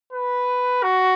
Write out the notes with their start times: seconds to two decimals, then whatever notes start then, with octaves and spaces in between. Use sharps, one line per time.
0.13 B4
0.83 F#4